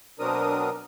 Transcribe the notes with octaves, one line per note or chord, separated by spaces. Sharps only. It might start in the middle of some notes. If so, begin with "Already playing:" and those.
B2 F#3 C4 D4 A#4 D#6